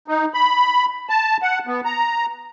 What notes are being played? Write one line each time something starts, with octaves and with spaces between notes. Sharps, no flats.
D#4
B5
A5
F#5
B3
A#5